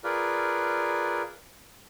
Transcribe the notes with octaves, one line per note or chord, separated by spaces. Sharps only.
F4 G#4 A#4 B4 D5